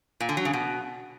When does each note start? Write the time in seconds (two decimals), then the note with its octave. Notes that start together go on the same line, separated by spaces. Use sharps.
0.20 A#2
0.29 D3
0.37 F#3
0.45 C#3
0.53 B2